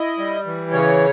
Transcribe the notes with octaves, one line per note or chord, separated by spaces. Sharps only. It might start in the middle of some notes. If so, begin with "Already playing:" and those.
Already playing: E4 D#5
G3
E3
C#3 C#5